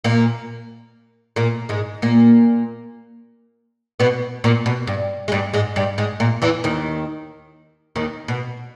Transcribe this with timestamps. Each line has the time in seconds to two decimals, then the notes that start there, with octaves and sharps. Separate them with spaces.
0.04 A#2 A#3
1.36 A#2 A#3
1.69 G#2 G#3
2.02 A#2 A#3
4.00 B2 B3
4.44 A#2 A#3
4.66 B2
4.87 G2
5.28 G#3
5.32 G2 G3
5.54 G#2 G#3
5.76 G2 G3
5.98 G#2 G#3
6.20 A#2 A#3
6.42 E2 E3
6.64 D#2 D#3
7.96 D#2 D#3
8.28 B2